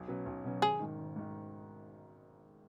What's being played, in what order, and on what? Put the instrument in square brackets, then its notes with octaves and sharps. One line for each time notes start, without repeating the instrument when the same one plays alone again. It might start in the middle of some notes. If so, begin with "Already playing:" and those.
Already playing: [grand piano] B1
B2 F#3 C#4 B4
B1
B2 F#3 C#4 B4
[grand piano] G#1 [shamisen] G#4
[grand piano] G#2 D#3
G#1
G#2 D#3